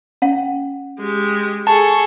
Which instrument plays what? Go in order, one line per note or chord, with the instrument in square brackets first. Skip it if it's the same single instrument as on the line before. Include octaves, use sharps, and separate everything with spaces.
[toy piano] C#4 F#5
[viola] G#3 G4
[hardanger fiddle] G#4 A4 [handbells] A5 [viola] C#6